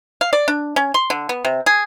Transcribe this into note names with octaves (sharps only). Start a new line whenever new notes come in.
F5
D5
D4
C#4
C6
D3
B3
C3
G#4